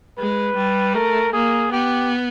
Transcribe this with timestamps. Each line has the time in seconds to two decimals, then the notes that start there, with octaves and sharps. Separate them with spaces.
0.18 G#3 B4
0.57 G3
0.95 A3 A#4
1.33 A#3 G#4
1.72 B3 G4